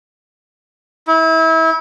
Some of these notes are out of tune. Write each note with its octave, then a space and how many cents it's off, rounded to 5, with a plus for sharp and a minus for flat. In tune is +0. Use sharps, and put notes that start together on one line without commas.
E4 -30